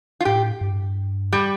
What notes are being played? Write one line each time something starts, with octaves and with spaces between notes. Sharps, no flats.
F4
A2 G4
G2
G3